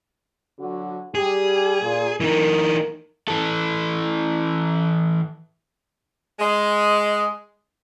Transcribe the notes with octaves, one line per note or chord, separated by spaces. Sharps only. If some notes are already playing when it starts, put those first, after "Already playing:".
D3 F#3 F#4
G3 G4 G#4
A#2
A2 E3 A#3 D#4 A#4
E3 A4
G#3